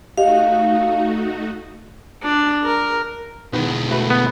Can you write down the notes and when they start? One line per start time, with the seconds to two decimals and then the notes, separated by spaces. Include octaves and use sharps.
0.18 A3 D#4 F#4 G4 D#5 F5
2.23 D4
2.64 A#4
3.53 B1 D#3 G#3 B3
3.90 A3 F#4 B4
4.10 B3